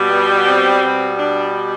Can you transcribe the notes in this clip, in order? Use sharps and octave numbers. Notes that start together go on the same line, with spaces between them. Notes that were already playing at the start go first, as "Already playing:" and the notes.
Already playing: B2 G3
B3
C4
B2 G3
D4